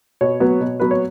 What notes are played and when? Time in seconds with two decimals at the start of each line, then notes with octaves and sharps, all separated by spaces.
0.21 B2 C#5
0.40 F#3 B3
0.61 B2
0.80 F#3 B3 B4
0.91 C#5